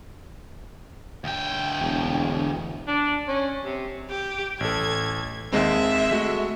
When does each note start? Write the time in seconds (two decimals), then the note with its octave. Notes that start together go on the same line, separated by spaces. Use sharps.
1.24 D2 G5
1.80 E1
2.88 D4
3.28 C#4
3.65 C3
4.09 G4
4.60 A1 A4 G#6
5.53 D#2 G#3 C4 E5
6.11 G#3 A3 F#4